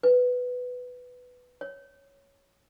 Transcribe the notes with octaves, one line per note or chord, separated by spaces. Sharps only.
B4
C#5